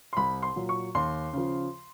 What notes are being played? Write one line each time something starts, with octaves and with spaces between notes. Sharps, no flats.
C6
C2 B5
C6
A#2 F#3
C#6
D#2 C6
C#3 F3